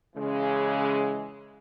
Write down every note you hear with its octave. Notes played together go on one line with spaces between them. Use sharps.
C#3 E3 G#3